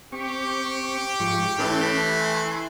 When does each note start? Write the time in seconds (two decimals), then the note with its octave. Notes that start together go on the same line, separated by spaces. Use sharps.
0.12 C4 G4 C#6
1.20 G#2 F3 C#6
1.59 E3 A3 C#4 E4 B4 A5
2.20 G#5 C6